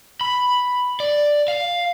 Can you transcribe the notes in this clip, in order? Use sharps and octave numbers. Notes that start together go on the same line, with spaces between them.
B5
D5
F5